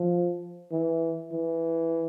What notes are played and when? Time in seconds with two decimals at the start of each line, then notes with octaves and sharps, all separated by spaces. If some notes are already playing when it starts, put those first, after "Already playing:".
Already playing: F3
0.72 E3
1.32 E3